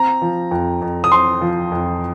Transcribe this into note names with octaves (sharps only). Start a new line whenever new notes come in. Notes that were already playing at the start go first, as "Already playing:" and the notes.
Already playing: C4 A#5
F3
F2
F2
D#6
C4 C6
F3
F2